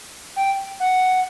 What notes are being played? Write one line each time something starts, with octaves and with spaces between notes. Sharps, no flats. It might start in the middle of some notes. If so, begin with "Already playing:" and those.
G5
F#5